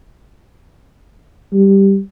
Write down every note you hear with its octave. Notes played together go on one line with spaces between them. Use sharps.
G3